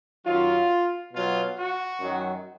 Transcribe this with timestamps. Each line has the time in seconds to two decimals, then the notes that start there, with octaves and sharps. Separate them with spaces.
0.24 F#2 D#3 F#3 F4
1.12 B2 F#3 F4
1.56 F#4
2.01 F#2 D#3 F#3